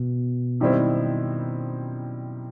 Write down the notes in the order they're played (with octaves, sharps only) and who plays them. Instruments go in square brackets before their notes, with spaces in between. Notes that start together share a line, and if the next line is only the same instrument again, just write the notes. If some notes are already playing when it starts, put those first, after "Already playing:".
Already playing: [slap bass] B2
[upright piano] F#2 D#3 G3 C4 E4